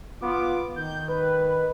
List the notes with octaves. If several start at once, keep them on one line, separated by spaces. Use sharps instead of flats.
B3 F4 D6
D#3 G6
B4